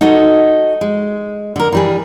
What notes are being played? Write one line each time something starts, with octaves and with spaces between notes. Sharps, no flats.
D#4 F#4 A4 D#5
G#3
D3 A#4
E3 G3 G#4